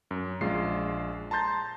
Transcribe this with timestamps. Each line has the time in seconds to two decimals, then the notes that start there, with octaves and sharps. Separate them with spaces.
0.11 F#2
0.41 A#1 G#3 F4 C7
1.31 A5 A#5 C6 G6 A6